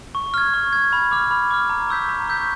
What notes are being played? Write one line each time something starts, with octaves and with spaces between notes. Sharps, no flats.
C#6
F6 G#6
C#6
F6 G#6
B5
D6 F6
B5
D6 F6
A#5
C#6 E6 G6 B6
A#5
C#6 E6 G6 B6